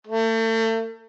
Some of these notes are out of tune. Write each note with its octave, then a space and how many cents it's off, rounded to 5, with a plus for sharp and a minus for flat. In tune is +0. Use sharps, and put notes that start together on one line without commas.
A3 +35